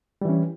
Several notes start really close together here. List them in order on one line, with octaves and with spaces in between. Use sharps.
G3 E3 C#4